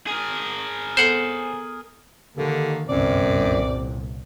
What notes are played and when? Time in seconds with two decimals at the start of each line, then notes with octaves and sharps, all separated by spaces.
0.07 G#4 A#4
0.97 B3 A4 C5 F#5
2.37 D3 D#3 A#3 G4
2.89 G1 C2 F#2 A#2 C4 D5